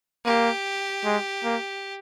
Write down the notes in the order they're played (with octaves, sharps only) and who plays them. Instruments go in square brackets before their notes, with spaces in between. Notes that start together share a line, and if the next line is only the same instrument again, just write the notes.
[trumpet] A#3 [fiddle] G4
[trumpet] G#3
A#3